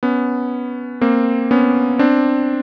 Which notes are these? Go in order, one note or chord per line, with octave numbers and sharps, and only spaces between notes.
B3 C#4
A#3 C4
B3 C#4
C4 D4